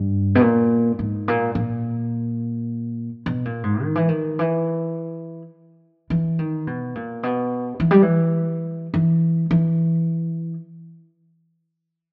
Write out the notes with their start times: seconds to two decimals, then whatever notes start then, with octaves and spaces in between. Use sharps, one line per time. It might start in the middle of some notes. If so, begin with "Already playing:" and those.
Already playing: G2
0.35 B2
0.42 A#2
0.99 G#2
1.28 A#2
1.55 A#2
3.26 B2
3.45 A#2
3.63 G#2
3.83 D#3
3.95 E3
4.09 D#3
4.39 E3
6.10 E3
6.39 D#3
6.67 B2
6.95 A#2
7.23 B2
7.80 E3
7.91 G3
8.02 E3
8.94 E3
9.51 E3